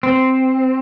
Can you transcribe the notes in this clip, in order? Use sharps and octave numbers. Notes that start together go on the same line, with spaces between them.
C4